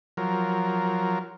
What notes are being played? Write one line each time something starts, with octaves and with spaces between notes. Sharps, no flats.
F3 F#3 A#4